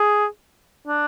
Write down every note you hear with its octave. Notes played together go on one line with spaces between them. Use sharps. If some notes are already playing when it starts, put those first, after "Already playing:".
Already playing: G#4
D4